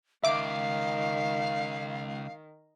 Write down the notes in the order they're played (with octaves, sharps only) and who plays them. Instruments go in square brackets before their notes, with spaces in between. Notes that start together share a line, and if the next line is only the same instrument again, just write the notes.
[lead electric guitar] C#2 [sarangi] D#3 [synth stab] E5 D6 D7 [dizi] F5